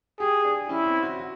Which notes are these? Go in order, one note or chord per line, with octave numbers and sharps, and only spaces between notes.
G4 G#4
D4
C#4 E4
C4
F#4
F#4